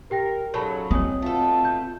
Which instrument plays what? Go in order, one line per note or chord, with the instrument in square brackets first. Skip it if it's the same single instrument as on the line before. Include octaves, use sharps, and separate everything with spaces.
[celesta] G4 G5 A#6 [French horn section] A#4
[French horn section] G#2 C#3 A4 [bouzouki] F#3 [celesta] C#5 A5 B5
[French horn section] E3 G3 G#3 [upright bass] C4 [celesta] C#5 G#5 D#6
[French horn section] B2 F4 [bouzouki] A3 A4
[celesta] G6